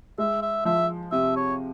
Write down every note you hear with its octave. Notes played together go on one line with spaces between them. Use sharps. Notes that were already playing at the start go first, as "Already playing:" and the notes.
G#3 E5
E5
F3 E5
C3 E5
C#5